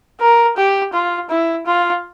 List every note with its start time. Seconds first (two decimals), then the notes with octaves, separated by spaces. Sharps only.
0.21 A#4
0.56 G4
0.93 F4
1.30 E4
1.66 F4